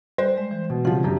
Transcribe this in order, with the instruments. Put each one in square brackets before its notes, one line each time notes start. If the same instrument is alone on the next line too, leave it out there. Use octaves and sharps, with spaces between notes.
[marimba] G3 D5 F#6 [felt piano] C5
[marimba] G#3
E3
[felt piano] B2
[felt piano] C#3 F3 G3 [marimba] C4 F#5
[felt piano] F#2 D4 G4